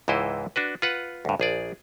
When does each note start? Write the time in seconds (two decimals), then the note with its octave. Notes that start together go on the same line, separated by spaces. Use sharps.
0.08 C#2 G#2 E3 E4 C5 D#5
0.56 D4 F#4 B4
0.82 F4 B4 F#5
1.25 D2 G2
1.40 A#1 G#4 D5